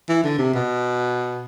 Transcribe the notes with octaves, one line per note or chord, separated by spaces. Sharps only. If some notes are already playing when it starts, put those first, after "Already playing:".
E3
D3
C3
B2